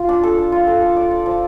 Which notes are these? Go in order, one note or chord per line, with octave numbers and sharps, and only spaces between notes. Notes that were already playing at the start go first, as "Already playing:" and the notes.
Already playing: F4
D4
A4
A4
F4
A4
A4
D5
D5
F3